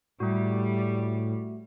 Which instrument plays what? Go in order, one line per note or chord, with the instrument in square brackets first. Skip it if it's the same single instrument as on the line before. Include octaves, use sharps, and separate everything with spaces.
[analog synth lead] A2 [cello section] G3 [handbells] A3 F#4